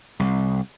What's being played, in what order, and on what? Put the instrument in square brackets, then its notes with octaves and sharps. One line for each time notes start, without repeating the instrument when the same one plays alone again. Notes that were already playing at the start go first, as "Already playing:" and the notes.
[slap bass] C2